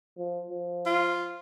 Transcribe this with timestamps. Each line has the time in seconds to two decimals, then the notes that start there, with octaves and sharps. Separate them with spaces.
0.17 F3
0.50 F3
0.86 F4